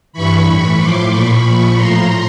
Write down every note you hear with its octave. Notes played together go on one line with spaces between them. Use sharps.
G2 E3 B5 C#6
A2 E3 B5 C#6
A2 F3 C6 D6
A#2 F3 B5 C#6
A#2 F3
A2 F3 A#5 C6